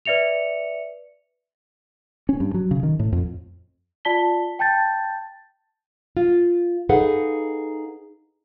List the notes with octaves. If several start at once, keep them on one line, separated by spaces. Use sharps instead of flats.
B4 D5 E5 C#7 F7
C#4
G2
F#3
C#3
D#3
A2
F2
F4 D5 A5 B6 G7
G5 A5 G6 A6
F4
D#4 G#4 A4 B4 F5 F#5